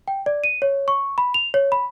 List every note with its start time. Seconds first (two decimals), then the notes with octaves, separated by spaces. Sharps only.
0.08 G5
0.26 D5
0.44 D#7
0.62 C#5
0.88 C#6
1.18 B5
1.34 F7
1.54 C#5
1.72 B5